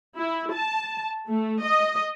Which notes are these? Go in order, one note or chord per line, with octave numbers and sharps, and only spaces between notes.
E4
A5
A3
D#5